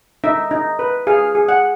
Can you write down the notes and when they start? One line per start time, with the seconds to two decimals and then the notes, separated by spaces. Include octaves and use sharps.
0.24 D#4 E5
0.51 D#4
0.79 B4
1.07 G#4 F5
1.35 G#4
1.49 F#5